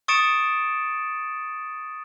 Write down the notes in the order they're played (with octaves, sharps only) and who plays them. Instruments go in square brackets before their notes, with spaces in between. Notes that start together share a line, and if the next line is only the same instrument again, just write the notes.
[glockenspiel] C#6 D#6 A6 C#7 D7 E7